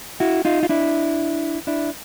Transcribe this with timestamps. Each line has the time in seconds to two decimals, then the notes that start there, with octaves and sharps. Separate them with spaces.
0.20 E4 F#4
0.45 D#4 F4
0.63 F4
0.69 D4 E4
1.67 D4 E4